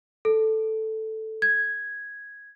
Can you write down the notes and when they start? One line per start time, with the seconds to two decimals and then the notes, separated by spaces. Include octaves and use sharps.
0.25 A4
1.42 G#6